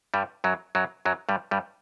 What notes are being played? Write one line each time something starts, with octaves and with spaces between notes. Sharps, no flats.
G2 G3
F#2 F#3
F#2 F#3
F#2 F#3
G2 G3
G2 G3